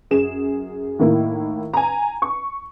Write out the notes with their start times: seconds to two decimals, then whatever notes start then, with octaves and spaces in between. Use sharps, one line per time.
0.11 F#2 G#4 E7
0.99 A2 D#3 A#3 E4
1.74 G#5 A#5
2.22 C#6